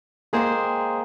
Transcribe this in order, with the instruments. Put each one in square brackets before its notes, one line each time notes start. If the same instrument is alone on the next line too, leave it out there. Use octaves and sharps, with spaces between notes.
[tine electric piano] G#3 G#4 C5 [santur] A#3 G5 D6